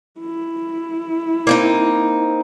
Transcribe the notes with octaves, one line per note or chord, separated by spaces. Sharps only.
E4
A#3 C4 D#4